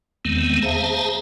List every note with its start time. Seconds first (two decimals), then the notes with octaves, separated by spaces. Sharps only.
0.25 E2 D#3 G#3 A3 B3 C4
0.62 G#4 C5 E5 F5 A5 A#5